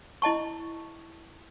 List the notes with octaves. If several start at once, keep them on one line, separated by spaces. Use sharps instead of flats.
E4 D#5 A5 C#6